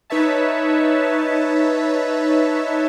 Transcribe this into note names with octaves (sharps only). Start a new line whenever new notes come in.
D#4 B4 C#5 E5 A5